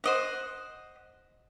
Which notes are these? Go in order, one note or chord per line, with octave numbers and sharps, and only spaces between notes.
C5 D#5 F#5